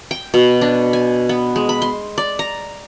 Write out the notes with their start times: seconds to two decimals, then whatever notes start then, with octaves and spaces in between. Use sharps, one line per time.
0.11 G5
0.34 B2
0.61 D4
0.93 G#5
1.29 B3
1.56 G#3
1.69 B5
1.82 C6
2.18 D5
2.39 A#5